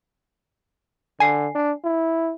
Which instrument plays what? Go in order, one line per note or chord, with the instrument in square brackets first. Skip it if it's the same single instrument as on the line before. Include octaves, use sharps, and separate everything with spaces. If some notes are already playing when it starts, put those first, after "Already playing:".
[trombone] D3 [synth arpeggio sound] G#5 C7
[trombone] D4
E4